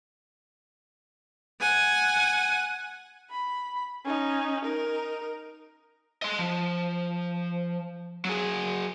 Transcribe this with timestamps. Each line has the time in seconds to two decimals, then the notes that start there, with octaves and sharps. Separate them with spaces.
1.61 F#5 G#5
3.30 B5
4.05 C#4 D#4
4.65 D#4 A#4
6.22 D#5 C6
6.38 F3
8.25 F#3 G#4